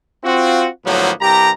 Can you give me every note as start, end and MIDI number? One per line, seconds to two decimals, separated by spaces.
0.24 0.68 60
0.24 0.68 65
0.24 0.68 66
0.86 1.11 45
0.86 1.11 50
0.86 1.11 53
0.86 1.11 54
0.86 1.11 58
0.86 1.11 59
1.21 1.50 36
1.21 1.50 43
1.21 1.50 67
1.21 1.50 82